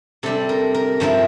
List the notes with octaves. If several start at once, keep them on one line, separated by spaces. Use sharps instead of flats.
C3 G3 D4 A4
A#4
A#4
G2 F3 C4 E4 A#4